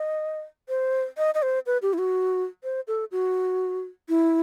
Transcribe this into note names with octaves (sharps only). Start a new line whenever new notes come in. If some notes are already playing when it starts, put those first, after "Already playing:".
Already playing: D#5
C5
D#5
D#5
C5
B4
G4
E4
F#4
C5
A4
F#4
E4